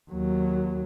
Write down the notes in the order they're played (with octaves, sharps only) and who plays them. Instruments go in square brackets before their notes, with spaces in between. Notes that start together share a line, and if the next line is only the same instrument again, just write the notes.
[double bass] D#2 F#3